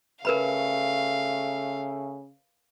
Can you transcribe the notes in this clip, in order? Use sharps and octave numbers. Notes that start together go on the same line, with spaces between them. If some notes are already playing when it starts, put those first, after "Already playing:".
C#3 A3 A#4 B4 F5 B5